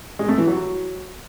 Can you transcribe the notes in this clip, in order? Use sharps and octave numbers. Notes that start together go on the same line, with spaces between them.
G#3
A3
E3
F#3